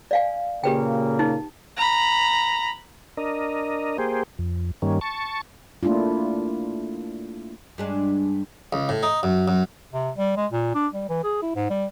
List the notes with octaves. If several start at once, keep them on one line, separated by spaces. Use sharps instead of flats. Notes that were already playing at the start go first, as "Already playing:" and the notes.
D5 F5 G#5
A#2 C#3 A#3 G4 B4 G5
D#4
A#5 B5
D4 A#4 D#5
A#3 G4 G#4 C5
F2
G2 D#3 G3 A#3 C#4
A5 C#6
A3 A#3 D4 E4 F4
G2 G#3 D4
C#2
A2
D#4
F#2
F#2
C3
G3
G#3
A#2
D4
G3
E3
G#4
E4
G#2
G3